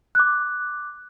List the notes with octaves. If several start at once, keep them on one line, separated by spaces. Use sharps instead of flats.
D6 F#6